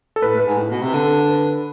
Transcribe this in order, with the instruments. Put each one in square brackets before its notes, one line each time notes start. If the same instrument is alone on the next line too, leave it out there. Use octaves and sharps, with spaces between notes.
[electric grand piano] A4
[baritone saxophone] A2 [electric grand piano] B4
[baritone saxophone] A2
[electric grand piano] B4
[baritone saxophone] G#2
A2
B2
C3
D3
[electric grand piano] B4